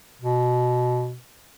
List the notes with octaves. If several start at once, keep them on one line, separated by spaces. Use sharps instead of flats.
B2